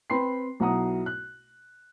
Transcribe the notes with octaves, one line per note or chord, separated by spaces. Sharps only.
C4 B4 G5 B5 C6 C7
B1 B2 E4 F#5 A#5 D#6
F#6